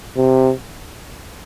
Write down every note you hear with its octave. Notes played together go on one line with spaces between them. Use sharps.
C3